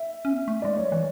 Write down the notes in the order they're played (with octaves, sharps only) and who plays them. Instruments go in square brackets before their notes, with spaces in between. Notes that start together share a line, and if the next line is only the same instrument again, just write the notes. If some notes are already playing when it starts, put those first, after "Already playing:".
Already playing: [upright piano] E5
[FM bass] C#4
B3
A3
[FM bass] G#3 [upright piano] D5
[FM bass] F#3 [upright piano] C#5
[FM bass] E3 [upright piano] C#5